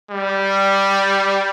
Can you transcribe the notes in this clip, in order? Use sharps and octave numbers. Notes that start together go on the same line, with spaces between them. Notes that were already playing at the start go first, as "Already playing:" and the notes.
G3